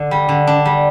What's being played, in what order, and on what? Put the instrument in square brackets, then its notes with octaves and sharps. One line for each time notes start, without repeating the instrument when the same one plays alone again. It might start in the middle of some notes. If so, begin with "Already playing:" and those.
Already playing: [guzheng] D3
G3
D3
D4
G3